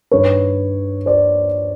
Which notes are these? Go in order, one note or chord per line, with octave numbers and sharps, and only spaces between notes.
G2 D#3 B4 C#5
C5 D5